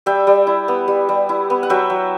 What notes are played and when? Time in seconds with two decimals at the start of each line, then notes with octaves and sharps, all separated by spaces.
0.06 G3 E5 G5
0.27 G3
0.47 E4
0.68 B3
0.88 G3
1.09 G3
1.29 E4
1.50 B3
1.63 F#5
1.70 F#3 E5 G5
1.90 F#3